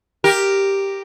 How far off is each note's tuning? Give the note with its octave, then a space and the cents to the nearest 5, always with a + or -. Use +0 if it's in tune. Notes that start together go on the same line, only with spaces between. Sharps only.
G4 +0 A#4 +0